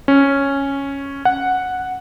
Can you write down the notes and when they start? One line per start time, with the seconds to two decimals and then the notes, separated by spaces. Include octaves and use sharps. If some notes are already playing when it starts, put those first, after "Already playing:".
0.08 C#4
1.25 F#5